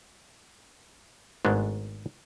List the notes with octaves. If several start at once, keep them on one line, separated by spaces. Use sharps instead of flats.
G#1 G#2 G#3 A3 B3 D4